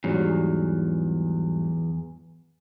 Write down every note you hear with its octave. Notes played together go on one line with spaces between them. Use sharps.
E2 G#2 F#3 G3